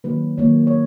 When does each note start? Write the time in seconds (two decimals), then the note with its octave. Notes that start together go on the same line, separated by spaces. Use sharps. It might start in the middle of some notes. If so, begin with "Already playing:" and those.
0.04 D#3 F#3 A#3 B4
0.38 D#3 F#3 A#3 C#5
0.67 C#5